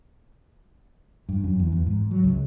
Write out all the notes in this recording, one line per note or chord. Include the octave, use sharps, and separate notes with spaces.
G2
F#2
E2
E2
G#2
F#3
C#2